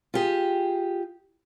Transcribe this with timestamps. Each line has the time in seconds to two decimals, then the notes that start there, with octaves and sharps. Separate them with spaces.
0.14 F4 G4 G#4